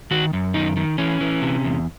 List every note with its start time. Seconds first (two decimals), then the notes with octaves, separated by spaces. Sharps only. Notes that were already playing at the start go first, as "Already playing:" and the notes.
0.11 D#3 F#4
0.33 F#2
0.54 D#3 D#4
0.77 D#3
0.98 E3 C#4
1.21 E3
1.42 C3
1.64 E2